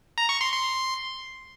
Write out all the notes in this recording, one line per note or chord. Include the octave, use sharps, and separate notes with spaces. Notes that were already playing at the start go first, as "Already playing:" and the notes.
A#5
C#6
C6
C6